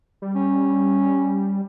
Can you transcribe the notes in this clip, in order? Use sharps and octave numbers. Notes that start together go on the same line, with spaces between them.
G3
C#4